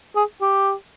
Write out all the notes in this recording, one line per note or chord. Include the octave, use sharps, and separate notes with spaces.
G#4
G4